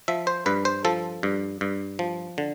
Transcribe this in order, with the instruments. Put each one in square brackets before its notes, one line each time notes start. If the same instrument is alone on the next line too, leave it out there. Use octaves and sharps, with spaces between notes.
[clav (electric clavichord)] F3 E5
C5
G2 B4
C5
F3 A4
G2
G2
F3
D3